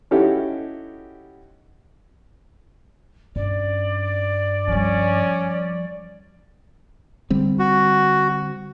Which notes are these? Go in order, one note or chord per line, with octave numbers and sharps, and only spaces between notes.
C#4 D#4 E4 F#4 G4 A4
G2 C#4 D5
F3 G3 C#4
D3 G3 C4
F#4